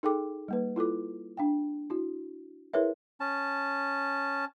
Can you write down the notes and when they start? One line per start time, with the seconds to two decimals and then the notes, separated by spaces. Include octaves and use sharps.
0.03 D#4 G#4 A4 G5 D6
0.48 G3 A#3 B4
0.76 E4 F4 A4 D6
1.37 D4 F5 G5
1.90 E4 F#4
2.73 E4 G#4 A#4 B4 C#5 E5
3.20 C#4 A5